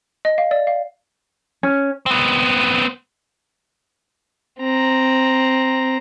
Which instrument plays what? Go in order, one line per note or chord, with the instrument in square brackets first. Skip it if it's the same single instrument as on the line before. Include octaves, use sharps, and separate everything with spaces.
[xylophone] D#5
F5
D5
F5
[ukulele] C#4
[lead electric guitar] B3 C4
[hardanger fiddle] C4 A#5